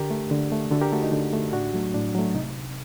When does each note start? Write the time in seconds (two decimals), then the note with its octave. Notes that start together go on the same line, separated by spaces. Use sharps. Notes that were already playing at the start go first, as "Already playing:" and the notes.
Already playing: D3 G4 A#4
0.10 A3
0.31 D3
0.52 A3
0.71 D3 F#4 A4
0.81 G4 A#4
0.92 A3 F#4 A4
1.02 D#4
1.12 D3
1.33 A3
1.53 A2 D4 F#4
1.74 F#3 A3
1.94 A2 D4
2.15 F#3 A3
2.35 C3 D#4